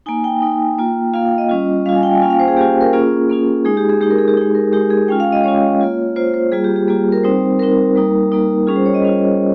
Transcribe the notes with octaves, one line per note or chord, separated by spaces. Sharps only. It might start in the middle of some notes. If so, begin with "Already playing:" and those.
A#3 D#4 G#5
G5
A#3 D#4
A#3 F4
A#3 F4 F5
G5
D#5
G3 C#4 F4
G3 C#4 F4 F5
G#5
G5
G#5
A#3 C#4 F4 G5
F5
C5
G#4
A#3 C#4 F4 G4
A#4
A#3 C#4 F4 G#4
A#3 C#4 F4
G#3 D#4 G#4
G4
G#4
G#3 D#4 G4
A#4
G#4
G4
G#3 D#4 G#4
A#4
G#3 D#4 G4
G#4
G#3 C#4 F4 G5
F5
D#5
G#3 C#4 F4 C#5
A#3 F4
A#3 F4 C5
C5
G3 A#3 F4 G#4
G4
G4
G3 A#3 F4 G#4
A#4
G3 C4 D#4 C5
G3 C4 D#4 A#4
G3 A#3 D#4
G3 A#3 D#4
G3 C#4 F4 G#4
C5
C#5
D#5
G3 C#4 F4